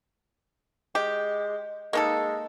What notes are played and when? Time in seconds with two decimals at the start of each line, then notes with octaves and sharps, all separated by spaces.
0.95 G#3 G4
1.93 G#3 A#3 D#4 A4